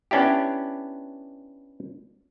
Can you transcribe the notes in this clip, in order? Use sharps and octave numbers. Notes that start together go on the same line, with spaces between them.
B3 C#4 D4 E4 G4